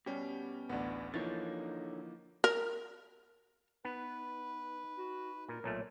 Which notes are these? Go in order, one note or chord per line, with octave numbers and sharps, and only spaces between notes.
B2 G3 C#4 G4
A1 D2 B3 D4
D3 E3 F3 A#3 D#4 C#5 A6
A#4
B3 D#4 B4
F#4
A#2 A#4
B1 A#2 A3 C#5